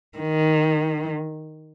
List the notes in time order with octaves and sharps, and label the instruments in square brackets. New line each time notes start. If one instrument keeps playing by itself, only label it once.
[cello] D#3